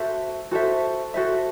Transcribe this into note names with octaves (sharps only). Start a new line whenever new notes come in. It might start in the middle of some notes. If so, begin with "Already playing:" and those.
Already playing: F#4 A4 C5 E5
F#4 A4 C5 E5
F#4 A4 C5 E5